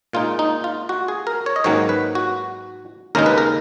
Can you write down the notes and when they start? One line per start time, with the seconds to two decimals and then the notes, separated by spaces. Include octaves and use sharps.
0.13 A#2 G#3 D#4 F4
0.39 D#4
0.64 F4
0.89 F#4
1.08 G#4
1.27 A#4
1.46 C#5
1.56 D#5
1.64 G#2 D#3 F#3 A#3 C#4 C#5
1.89 B4
2.15 F#4
3.15 D#2 C#3 G#3 D#4 A#4
3.26 B4
3.38 A#4